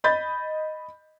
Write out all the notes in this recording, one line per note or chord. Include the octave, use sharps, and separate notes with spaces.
D#5 B5 G6 A6